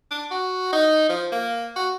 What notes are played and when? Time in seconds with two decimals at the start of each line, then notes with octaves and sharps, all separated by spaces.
0.11 D4
0.31 F#4
0.73 D#4
1.09 F3
1.32 A#3
1.76 F#4